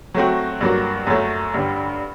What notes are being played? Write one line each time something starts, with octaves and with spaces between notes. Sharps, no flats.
F#3 A3 C4 F#4
G2 F#3 A#3 F#4
F#2 F#3 A3
G2 D3 G3